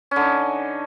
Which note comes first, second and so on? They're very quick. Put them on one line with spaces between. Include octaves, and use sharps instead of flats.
C#4 D3 D#4